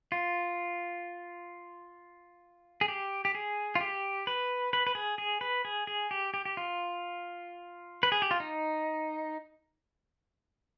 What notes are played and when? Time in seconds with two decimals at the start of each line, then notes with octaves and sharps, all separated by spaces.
0.12 F4
2.81 G#4
2.88 G4
3.25 G4
3.35 G#4
3.75 F4
3.81 G4
4.27 B4
4.73 B4
4.87 B4
4.95 G#4
5.18 G#4
5.41 B4
5.65 G#4
5.87 G#4
6.11 G4
6.34 G4
6.45 G4
6.57 F4
8.03 B4
8.12 G#4
8.22 G4
8.31 F4
8.40 D#4